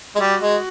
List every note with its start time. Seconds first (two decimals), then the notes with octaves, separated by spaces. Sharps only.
0.16 G#3
0.19 G3 F#4
0.41 G#3